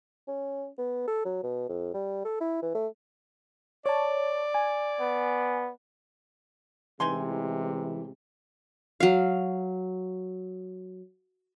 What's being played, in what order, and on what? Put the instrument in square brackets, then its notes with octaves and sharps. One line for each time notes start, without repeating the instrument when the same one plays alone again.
[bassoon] C#4
B3
A4
F#3
B2
F2
G3
A4
E4
E3
A3
[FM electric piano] C#5 A5 [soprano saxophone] D5
[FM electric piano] G#5
[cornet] B3
[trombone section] A1 C3 G#3 [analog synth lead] E3 [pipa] D#4 G#5 C6
[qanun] F#3 F5